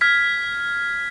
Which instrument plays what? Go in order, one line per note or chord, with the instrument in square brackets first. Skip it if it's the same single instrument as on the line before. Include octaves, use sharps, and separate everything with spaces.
[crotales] F6 G#6 B6